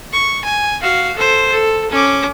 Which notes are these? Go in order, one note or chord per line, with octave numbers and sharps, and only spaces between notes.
C#6
G#5
F#4 F5
A4 C5
A4
C#4 D6